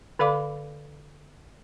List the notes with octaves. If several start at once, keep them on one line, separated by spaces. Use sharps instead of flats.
D3 A4 D5 F5 B5 D6